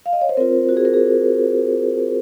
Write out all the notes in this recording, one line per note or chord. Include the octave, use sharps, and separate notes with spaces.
F5
D#5
C#5
C5
C4 F4 A#4
F#4
G#4
A#4
G#4